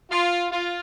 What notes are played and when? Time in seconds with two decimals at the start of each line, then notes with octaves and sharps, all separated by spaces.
0.10 F4
0.51 F4